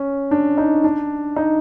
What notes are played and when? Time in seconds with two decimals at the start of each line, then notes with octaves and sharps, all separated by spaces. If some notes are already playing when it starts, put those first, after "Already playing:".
Already playing: C#4
0.31 D4
0.58 D#4
0.84 D4
1.36 D#4